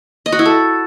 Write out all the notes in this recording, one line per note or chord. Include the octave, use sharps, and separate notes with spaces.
D#5
F#4
E4
A4